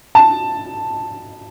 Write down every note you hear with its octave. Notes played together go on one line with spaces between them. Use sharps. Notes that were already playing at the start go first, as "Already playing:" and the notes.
A5